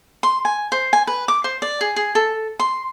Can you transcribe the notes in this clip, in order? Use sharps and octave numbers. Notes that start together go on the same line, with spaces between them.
C6
G#5
C5
G#5
B4
D6
C5
D5
G#4
G#4
A4
C6